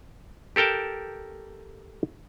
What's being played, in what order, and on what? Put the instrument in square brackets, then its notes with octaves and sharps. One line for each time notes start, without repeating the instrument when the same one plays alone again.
[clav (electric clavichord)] G4 A4 A#4 G5 A5